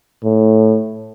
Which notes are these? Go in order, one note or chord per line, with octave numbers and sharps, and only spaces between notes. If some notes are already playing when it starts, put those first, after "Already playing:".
A2